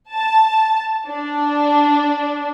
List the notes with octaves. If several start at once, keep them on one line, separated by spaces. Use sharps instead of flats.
A5
D4